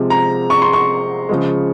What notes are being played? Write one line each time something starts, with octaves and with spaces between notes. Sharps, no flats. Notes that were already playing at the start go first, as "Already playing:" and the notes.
Already playing: C3 F3 G#3
A#5
C#6
C6
C#6
C#3 F3 G#3